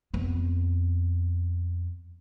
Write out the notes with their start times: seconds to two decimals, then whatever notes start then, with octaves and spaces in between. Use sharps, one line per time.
0.14 F2 B3